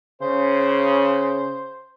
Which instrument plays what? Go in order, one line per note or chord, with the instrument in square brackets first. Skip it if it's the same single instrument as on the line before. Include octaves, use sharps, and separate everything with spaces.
[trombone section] C#3 [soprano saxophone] C5